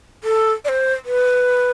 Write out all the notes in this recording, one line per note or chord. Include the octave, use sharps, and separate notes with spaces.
A4
D5
C5
B4